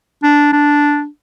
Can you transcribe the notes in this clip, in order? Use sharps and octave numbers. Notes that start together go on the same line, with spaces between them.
D4
D4